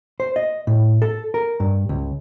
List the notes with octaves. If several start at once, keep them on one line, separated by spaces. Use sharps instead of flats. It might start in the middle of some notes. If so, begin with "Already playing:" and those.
C5
D#5
A2
A4
A#4
G2
C#2